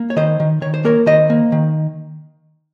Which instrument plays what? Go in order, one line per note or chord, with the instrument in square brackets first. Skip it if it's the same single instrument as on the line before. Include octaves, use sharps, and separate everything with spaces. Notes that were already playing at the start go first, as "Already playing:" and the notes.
Already playing: [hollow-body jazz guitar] A#3
C#5
D#3 C5 D#5
D#3
D#3 C#5
C5
A#3 A#4 C#5
D#3 C5 D#5
A#3
D#3